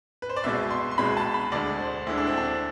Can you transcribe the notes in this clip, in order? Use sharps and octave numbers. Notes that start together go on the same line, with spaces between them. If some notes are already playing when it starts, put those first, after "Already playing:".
B4
C5
D5
C2 B2 G#3 E5
C6
C6
C2 B2 G#3 B5
A5
B5
D2 D3 G#3 D5
C5
D2 D3 G#3 E4
D4
C4
D4